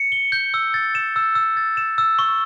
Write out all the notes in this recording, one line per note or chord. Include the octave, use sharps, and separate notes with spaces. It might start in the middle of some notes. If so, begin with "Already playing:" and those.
Already playing: C#7
G7
G6
E6
A6
E7
E6
E6
A6
E7
E6
C#6